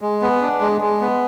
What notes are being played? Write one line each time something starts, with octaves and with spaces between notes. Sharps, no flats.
G#3
B3
D4
G#3
G#3
B3